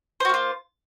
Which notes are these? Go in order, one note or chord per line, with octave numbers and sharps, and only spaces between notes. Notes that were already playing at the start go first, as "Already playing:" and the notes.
A#3 F4 F#4 C5